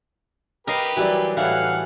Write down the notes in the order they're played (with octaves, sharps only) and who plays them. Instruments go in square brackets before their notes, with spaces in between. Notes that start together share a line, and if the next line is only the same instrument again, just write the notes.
[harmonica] G4 B4 [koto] A#4 D#5 F5
[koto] E3 [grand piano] F#3 G3 D5
[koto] A2 E3 [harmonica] F5 F#5